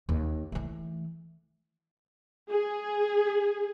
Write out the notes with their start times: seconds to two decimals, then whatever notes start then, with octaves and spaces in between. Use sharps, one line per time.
0.09 D#2
0.52 E3 A3
2.50 G#4